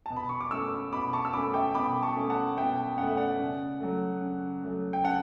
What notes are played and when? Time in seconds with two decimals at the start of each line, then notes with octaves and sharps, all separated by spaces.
0.06 B2 A5
0.16 B5
0.29 C#6
0.41 D6
0.51 A3 C#4 C#6 E6
0.92 B2 B5 D6
1.13 A5 C#6
1.25 E6
1.33 A3 C#4 B5 D6
1.54 E5 G5
1.74 B2 B5 D6
2.03 A5 C#6
2.16 A3 C#4
2.30 F#5 A5
2.57 B2 E5 G5
2.98 C#4 F#5
3.02 A3
3.07 E5
3.17 D5 F#5
3.39 C#3
3.81 F#3 A3
4.21 C#3
4.64 F#3 A3
4.93 G5
5.04 C#3 F#5 A5